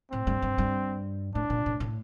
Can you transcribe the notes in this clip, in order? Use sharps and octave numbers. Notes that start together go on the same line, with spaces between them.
A2 C4
G2
G2
G2
A2 D4
A#2
A2
A2